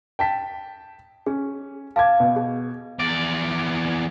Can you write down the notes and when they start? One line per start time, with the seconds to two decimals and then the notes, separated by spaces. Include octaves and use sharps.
0.19 G5 A5 B6
1.26 C#4 G#4
1.96 F5 A5 D6 G#6
2.20 B2
2.36 G#4
3.00 E2 D5